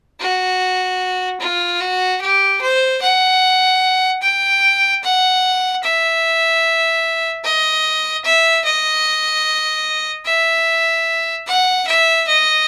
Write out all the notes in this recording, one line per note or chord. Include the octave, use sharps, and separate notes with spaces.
F#4
F4
F#4
G4
C5
F#5
G5
F#5
E5
D#5
E5
D#5
E5
F#5
E5
D#5